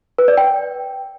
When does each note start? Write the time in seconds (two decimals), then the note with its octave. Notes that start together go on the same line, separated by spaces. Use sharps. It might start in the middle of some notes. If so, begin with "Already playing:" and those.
0.18 B4
0.28 D5
0.37 G5